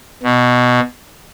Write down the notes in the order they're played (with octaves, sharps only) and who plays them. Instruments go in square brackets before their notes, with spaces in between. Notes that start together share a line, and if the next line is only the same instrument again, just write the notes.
[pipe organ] B2